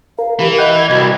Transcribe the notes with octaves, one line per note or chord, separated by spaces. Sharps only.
A#4 F5
E3 G4
D#5 F#5 G5
G#6
C2 F#4